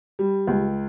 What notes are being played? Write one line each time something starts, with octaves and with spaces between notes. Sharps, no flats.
G3
C#2